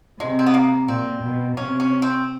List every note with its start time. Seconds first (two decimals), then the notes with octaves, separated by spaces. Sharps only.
0.20 C3 G#3
0.39 C4
0.46 B3
0.54 A#3
0.88 A#2 C4
1.23 B2
1.57 C3 C#4
1.80 C#4
2.02 C4